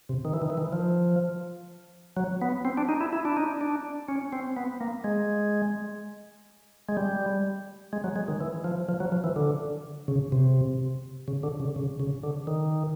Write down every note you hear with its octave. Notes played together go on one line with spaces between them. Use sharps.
C3
D#3
E3
D#3
E3
D#3
F3
F#3
B3
C4
D4
D#4
E4
E4
D4
D#4
D4
C#4
C4
B3
A#3
G#3
G#3
G3
G#3
F#3
G#3
D#3
E3
F3
F3
F#3
F3
E3
D3
C#3
C3
C#3
D3
C#3
C#3
C#3
D3
D#3